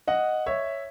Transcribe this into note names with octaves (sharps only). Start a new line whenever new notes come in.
D#5 F#5
C#5 E5